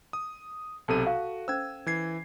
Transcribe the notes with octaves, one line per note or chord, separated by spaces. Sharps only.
D#6
B1 C3 A4 A5 D#7
F#4 F5
C#4 C5 E6 G#6
E3 G#6 C7